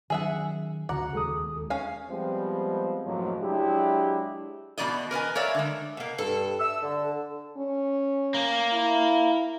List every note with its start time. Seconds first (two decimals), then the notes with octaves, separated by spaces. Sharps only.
0.10 D#3 F#3 C#4 G#4 E5 F#5
0.89 D2 C#3 F#4 F#5 A#5 D6
1.13 E1 D#2 G#3 G#4 A4 D#6
1.70 C#4 F5
2.09 F3 G3 G#3 B3 C4
3.05 C#2 F#2 A2 F3 F#3 A#3
3.39 F#3 G#3 D4 E4 G4
4.78 E2 B2 E3 C4 D5 D#5
5.11 A#4 B4 D#5 G#5
5.35 A#4 C#5 D5 E5 F5
5.55 D3 G#3
5.97 B2 A#3
6.18 G2 A4
6.60 E6
6.83 D3
7.58 C#4
8.34 A#3
8.73 E4